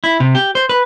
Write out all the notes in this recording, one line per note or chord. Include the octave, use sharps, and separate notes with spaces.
E4
C3
G4
C5
B4